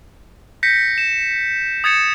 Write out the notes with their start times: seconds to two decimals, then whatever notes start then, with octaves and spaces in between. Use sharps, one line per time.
0.63 G6 A#6 B6 C#7
0.98 E7
1.84 D#6 G#6 A6 C#7 E7